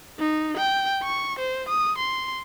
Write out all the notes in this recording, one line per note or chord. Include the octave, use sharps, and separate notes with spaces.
D#4
G5
C#6
C5
D#6
C6